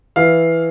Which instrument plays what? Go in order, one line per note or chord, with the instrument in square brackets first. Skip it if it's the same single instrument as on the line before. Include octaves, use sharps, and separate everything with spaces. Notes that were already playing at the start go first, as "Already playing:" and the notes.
[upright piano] E3 F5